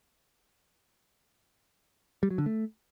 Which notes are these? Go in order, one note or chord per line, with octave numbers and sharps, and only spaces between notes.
G3
F#3
D3
A3